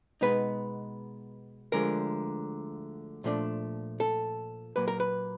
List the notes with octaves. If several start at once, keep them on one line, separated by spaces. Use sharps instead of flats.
B2 G#3 B3 D#4 B4
D2 D3 F3 G#3 A#4
A#2 F3 A3 D4
A4
A#2 F#3 A#3 B4
A#4
B4